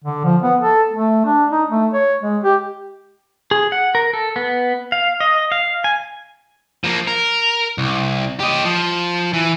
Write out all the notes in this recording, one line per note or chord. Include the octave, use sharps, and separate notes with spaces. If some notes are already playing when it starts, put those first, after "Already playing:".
D3
F3
B3
A4
A3
D4
D#4
A3
C#5
G#3
G4
G#4
F#5
A#4
A4
B3
F5
D#5
F5
G#5
F3 A#3
A#4
C2
G4 D#5
F3
E3